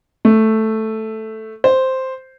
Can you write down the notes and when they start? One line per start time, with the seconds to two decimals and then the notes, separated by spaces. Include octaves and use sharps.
0.25 A3
1.64 C5